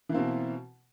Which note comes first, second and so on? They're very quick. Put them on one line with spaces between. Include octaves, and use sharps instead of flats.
E3 A#3 C4 B2